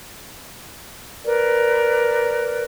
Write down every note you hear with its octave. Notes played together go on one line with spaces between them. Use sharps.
A#4 B4 D5